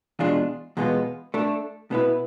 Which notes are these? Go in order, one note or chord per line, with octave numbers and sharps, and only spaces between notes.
E2 B2 G#3 D4 F4
E2 B2 G#3 B3 F4
A3 D4 A4
B2 B3 E4 B4